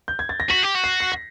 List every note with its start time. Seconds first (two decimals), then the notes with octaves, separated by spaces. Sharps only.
0.08 G6
0.19 G#6
0.29 A6
0.40 A#6
0.50 F#4 B6
0.63 G4
0.75 F#4
0.84 C7
1.00 C7
1.12 A#6